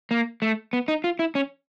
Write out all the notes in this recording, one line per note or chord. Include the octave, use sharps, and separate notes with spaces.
A#3
A3
B3
D#4
F4
E4
C#4